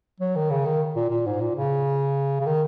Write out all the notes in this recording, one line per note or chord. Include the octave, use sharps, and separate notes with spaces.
F#3
D#3
C#3
D#3
A#2
A#2
G#2
A#2
C#3
C#3
D#3